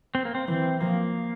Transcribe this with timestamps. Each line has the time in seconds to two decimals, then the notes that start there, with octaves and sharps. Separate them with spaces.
0.15 C4
0.25 A#3
0.35 C4
0.48 E3 C4
0.81 F3 A#3